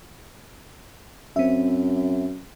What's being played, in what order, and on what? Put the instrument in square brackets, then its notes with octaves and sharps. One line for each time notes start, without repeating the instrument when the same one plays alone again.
[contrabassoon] F#2 [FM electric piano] C4 E5